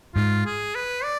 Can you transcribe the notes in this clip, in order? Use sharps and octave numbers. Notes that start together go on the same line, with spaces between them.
G#2 F4
G#4
B4
D5